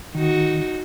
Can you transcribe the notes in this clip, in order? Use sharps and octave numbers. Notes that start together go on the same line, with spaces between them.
D#3 D#4 F#4